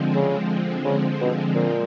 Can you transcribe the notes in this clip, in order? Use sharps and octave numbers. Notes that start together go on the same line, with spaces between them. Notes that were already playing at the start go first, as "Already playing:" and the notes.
Already playing: D3 F3 G#3 C4
C#3
C#3
B2
A#2